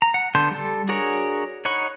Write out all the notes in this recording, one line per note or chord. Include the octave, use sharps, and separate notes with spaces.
A#5
F#5
D3 B3 A5 C6 G6
G3 A4
D4 F#4 G#4 A#4 C#5
D#4 C#5 F#5 B5 C#6